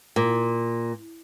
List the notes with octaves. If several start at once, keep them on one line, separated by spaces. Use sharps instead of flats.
A#2